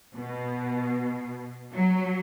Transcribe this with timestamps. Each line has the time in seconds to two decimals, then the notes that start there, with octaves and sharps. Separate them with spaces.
0.16 B2
1.74 F#3